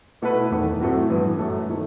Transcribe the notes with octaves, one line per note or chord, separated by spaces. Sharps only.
B2 A3 E4 B4
E2 D#3 A3
A2 F#3 A3 C4 F#4
G2 E3 B3
F#2 F#3 A3
D#3 A3